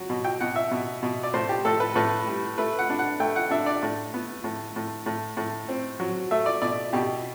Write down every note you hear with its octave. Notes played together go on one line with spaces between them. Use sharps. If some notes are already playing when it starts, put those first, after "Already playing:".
Already playing: F#3
B2
G5
B2 F#5
E5
B2
B2
D5
A2 C5
G4
A2 A4
B4
A2 B4
G3
A3 B4
F#5
D4
F#5
A3 G5
F#5
D4 E5
D5
A2
B3
A2
A2
A2
A2
C4
F#3
A3 E5
D5
B2 D5
B2 G4